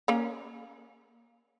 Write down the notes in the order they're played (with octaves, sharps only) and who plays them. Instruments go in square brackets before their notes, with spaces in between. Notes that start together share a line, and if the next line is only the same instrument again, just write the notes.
[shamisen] A#3 C#4